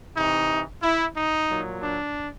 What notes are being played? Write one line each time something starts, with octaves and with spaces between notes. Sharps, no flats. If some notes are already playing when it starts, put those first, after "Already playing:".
C3 E3 D#4
E4
D#4
A#2 F#3
D4